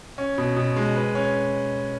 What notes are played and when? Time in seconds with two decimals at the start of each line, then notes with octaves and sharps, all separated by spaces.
0.18 C#4
0.38 B2
0.56 B2
0.76 G#3
0.96 B4
1.15 C#4